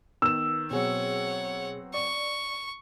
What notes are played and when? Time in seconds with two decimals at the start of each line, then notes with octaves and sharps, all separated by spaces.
0.22 D#3 B3 E6 E7
0.71 B2 F#3 B3 C4 G#4 C#5 F#5
1.94 D5 C#6